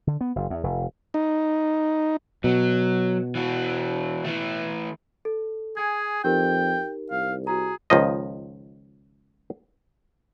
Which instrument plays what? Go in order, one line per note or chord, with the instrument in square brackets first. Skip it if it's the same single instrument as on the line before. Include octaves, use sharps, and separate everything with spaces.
[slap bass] D3
B3
F#1
E2
F1
[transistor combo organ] D#4
[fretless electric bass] B2 [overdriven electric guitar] F#3
[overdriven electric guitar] E3 F#4
E3 A3
[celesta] A4
[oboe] G#4 [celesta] G#5 G#6
[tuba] F2 [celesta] D#4 G4 A#4 [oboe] G5
[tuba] C2 [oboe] F5
[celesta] F#4 A#5 [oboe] G#4
[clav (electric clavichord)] C#2 D#3 F3 D#5